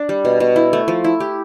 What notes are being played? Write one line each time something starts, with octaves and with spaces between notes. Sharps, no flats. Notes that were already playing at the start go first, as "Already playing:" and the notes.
Already playing: D4
G3
B2
B2
E4
A3
F3
E4
G4